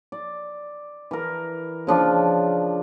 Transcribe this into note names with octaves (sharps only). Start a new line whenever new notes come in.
D5
E3 A#4
C#3 F3 D4 F4